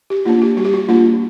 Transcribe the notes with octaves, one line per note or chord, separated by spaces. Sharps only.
G4
A#3 D4 F4
G4
G3 F#4
G4
F#4
A#3 D4 F4